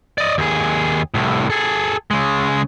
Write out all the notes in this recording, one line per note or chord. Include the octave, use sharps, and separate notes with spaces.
D5 D#5
D#2 G#4
C2 A2
G#4 A4
C#3 G#3